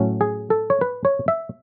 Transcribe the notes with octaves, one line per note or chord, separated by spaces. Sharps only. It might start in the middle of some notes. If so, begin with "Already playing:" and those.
Already playing: A2 F#3 A3 C#4
G#4
A4
C#5
B4
C#5
E5